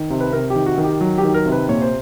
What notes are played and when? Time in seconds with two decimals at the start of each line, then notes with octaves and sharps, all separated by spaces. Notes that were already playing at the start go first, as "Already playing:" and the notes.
Already playing: D#3
0.10 C3
0.20 B4
0.33 C3 A#4
0.50 G4
0.55 D#3
0.66 F#4
0.78 D#3
0.84 G4
1.01 F#3
1.18 G4
1.23 D#3
1.34 A#4
1.46 C3
1.52 B4
1.69 A#2 C#5
1.82 C5